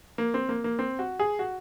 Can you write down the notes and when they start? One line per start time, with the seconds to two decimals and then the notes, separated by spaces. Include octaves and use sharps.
0.18 A#3
0.34 C4
0.49 A#3
0.64 A#3
0.79 C4
0.99 F#4
1.20 G#4
1.39 F#4